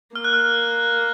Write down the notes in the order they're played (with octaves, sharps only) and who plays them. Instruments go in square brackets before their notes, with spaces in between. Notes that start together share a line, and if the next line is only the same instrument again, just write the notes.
[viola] A#3 [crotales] F6
[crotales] F#6
F6